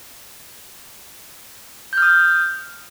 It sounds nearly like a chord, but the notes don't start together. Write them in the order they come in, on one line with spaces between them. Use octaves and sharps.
G6 F6 D#6